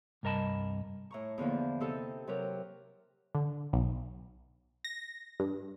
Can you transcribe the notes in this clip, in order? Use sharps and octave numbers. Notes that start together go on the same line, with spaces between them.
C2 G2 A#4 D#5 A5 B5
A2 A#5 C#6
E2 D3 F3 A#3
C3 D#4 A4
C3 F#3 G4 A#4
D3
B1
A#6
G2